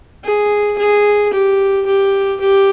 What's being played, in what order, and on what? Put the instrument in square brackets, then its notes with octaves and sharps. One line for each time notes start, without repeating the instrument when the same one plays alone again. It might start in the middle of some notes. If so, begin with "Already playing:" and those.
[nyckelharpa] G#4
G#4
G4
G4
G4